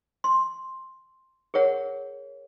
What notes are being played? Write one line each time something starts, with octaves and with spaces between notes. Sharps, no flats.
C6
G#4 A#4 C#5 F#5